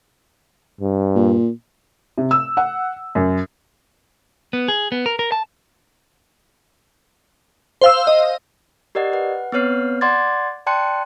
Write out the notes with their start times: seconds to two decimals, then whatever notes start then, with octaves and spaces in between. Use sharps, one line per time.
0.81 G2
1.15 A#2
2.18 C3
2.31 E6
2.57 F#5
3.15 F#2
4.53 B3
4.68 G#4
4.92 B3
5.06 A#4
5.19 A#4
5.32 A5
7.81 C5 F5 E6
8.07 D#5
8.95 G4 A#4 D5 D#5 F#5
9.12 B4 F#5
9.52 B3 C4 B4 C#5 F6 C7
10.01 D5 F#5 C6 D6 G#6 A6
10.67 D5 G5 A5 C6 F#6 C#7